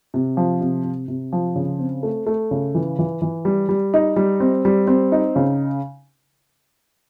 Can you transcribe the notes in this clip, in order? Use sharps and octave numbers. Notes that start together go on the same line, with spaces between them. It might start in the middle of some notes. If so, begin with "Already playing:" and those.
C3
F3
C3
C3
C3
F3
C#3
C4
A3
A3
C#3
E3
E3
E3
G3
G3
D#4
G3
C4
G3
C4
D#4
C#3